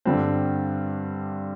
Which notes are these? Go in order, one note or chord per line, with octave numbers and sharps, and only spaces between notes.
G2 D3 G3 C4